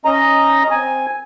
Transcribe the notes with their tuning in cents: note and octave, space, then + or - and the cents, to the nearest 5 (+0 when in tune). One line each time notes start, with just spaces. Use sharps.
C#4 +0 D#5 +0 A#5 +0
C4 +0 G#5 +0